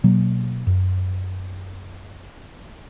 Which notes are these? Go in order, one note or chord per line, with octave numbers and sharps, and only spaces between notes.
B2 F#3 A#3
F#2